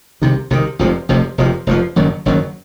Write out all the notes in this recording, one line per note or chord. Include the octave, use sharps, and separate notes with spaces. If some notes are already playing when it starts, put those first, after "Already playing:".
C2 C3 D#3
C2 C3 D#3
F1 F2 C3 F3
F1 F2 C3 F3
F1 F2 C3 F3
F1 F2 C3 F3
F#1 F#2 D#3 F#3
F#1 F#2 D#3 F#3